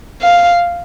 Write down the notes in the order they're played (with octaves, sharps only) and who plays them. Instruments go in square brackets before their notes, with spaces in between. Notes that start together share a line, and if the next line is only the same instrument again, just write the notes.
[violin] F5